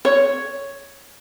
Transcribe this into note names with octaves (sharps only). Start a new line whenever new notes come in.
C#5